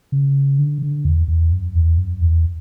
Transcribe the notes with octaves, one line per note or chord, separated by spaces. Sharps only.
C#3
D3
D3
E2
E2
F#2
E2
F#2
E2